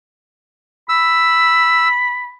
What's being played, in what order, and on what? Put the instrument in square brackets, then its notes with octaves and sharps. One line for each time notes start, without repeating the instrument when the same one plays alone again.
[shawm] B5 [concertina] E6